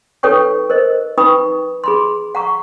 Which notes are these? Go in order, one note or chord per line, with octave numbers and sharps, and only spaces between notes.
D#4 A4 B4 C#5 G5 C#6
A#4 C5 D#5
D#4 B4 G5 B5 C#6 D#6
G#4 B5 C6
F#5 A#5 C#6